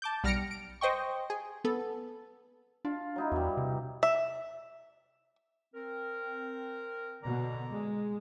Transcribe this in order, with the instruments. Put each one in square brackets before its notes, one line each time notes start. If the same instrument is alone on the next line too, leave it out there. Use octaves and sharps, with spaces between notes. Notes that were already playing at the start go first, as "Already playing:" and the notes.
[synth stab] A5 D6 G6
B1 G3 F6 A#6 C#7 D7
D7
C5 D#5 G5 C#6
G#4
B3 A4
[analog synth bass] D4 [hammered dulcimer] F4
[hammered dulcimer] F#3 D#4 E4
[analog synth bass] E2 [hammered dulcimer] G2 G3
[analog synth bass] C3
[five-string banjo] E5
[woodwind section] C4 A#4
[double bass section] B2 [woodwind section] D3 D5 A#5
[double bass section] G#3